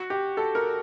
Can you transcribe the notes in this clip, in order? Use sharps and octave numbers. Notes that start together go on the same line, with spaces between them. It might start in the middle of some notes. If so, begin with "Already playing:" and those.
Already playing: F#4
G4
A4
A#4